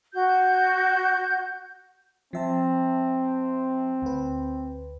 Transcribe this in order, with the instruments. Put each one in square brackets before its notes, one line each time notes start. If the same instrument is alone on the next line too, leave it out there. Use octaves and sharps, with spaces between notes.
[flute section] F#4 G6
[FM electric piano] F3 E5 A5 [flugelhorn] C4
[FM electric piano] D2 B4